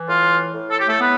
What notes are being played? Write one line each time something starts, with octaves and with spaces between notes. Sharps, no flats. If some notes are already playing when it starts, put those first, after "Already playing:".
Already playing: E3
A2 F4
A2
A4
G4
A3 A4
B3 B4